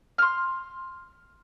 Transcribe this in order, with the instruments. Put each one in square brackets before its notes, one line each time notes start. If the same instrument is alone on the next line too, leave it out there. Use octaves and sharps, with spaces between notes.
[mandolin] C6 F6